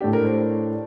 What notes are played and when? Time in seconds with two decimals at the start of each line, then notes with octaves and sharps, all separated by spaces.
0.01 A2 A3 D4 G4
0.13 A#4
0.25 C5